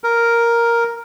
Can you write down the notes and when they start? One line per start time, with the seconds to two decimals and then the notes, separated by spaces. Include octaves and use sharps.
0.04 A#4